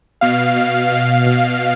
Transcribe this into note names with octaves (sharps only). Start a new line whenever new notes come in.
B2 F5
B2
B2 F5
B2